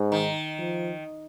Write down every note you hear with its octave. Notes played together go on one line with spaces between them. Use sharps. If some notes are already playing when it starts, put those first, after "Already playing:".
Already playing: G#2
D#3
F3